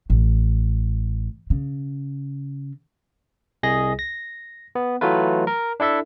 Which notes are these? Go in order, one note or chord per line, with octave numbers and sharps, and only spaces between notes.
A1
C#3
C2 G#4 D#5 A#6
A#6
B3
E3 F#3 A3 F4 B4
A#4
D4 E4 A4 E5